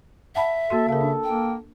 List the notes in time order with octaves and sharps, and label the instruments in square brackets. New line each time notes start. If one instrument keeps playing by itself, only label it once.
[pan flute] E5 [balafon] F#5 A5 B5
[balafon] A#3 F#4 C6 [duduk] A4
[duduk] C#3 [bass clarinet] A4 [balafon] A#4 F5
[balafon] D4
[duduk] A#3 [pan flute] G5